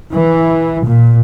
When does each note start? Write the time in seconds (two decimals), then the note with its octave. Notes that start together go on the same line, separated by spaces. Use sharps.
0.12 E3
0.83 A#2